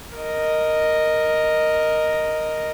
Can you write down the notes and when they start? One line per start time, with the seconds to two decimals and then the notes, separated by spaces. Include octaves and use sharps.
0.16 A#4 D#5